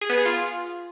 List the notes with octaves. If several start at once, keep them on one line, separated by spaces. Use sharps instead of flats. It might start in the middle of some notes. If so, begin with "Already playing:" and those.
G#4
B3
G#4
F4